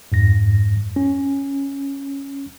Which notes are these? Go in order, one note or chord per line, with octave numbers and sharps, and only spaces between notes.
F2 G#2 A#6
C#4